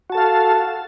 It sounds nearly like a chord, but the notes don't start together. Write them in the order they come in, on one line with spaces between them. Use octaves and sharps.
F#4 A5 A4 F5